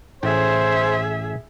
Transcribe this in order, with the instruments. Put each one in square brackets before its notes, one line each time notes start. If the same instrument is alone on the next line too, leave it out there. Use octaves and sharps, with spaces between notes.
[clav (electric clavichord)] A1 A2 G5 [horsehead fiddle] G#4 E5 [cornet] C5